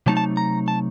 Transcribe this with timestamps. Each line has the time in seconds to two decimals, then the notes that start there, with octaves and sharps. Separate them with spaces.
0.06 C3 F#3 A3 D#4 A5
0.17 A5
0.37 A#5
0.68 A5